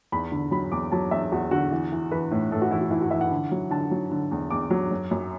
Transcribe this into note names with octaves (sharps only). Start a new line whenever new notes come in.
E2 B5
D3
F#3 B5
E2 D6
F#3 A5
E2 E5
E2 F#4
D3 F#4
E3
E3
E3 B4
A2
A2 A4
F#4
E3 E4
F#4
E3 E4
F#4
E3 E5
F#5
D3
F#3
D3 A5
F#3
D3
E2
E2 D6
F#3
F#2
F#2